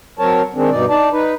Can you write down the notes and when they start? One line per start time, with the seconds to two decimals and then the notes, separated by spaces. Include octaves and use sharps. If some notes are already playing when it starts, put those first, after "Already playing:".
0.19 F#3 C4 A#4 C#5 A5
0.55 D#3 G#3 C4 D4
0.71 G2 B2 D#4 D5
0.89 D#4 D5 A5
1.12 D#4 B4